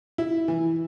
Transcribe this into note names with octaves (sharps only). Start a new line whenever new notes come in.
E4
E3